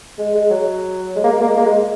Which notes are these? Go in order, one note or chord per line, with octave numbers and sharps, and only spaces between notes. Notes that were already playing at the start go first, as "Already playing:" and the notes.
G#3
G#3
F#3
G#3
A#3
G#3
A#3
G#3
A#3
G#3